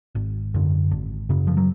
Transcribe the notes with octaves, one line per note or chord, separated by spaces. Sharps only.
G#1
F#2 D3
G#1
F#2 C#3
F3
F#3